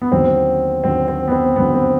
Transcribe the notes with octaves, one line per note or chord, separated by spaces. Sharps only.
B3
D#2 D3 F#3 C4
D#2 D3 F#3 C4
C4
B3
C4
D#2 D3 F#3 B3
C4